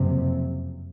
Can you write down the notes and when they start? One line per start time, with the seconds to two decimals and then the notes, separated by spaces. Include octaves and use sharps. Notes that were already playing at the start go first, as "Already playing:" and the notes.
Already playing: F#1 F2 C3